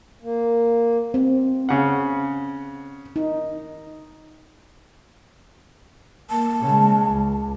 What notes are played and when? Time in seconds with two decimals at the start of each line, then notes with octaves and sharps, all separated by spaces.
0.22 A#3
1.14 C4
1.69 C#3 F#5
3.16 D#4
6.30 A#3 A5
6.60 C#3 G#3
7.10 C#2